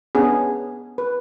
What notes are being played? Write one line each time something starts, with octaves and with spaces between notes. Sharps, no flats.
B3 C#4 D4 G#4
B4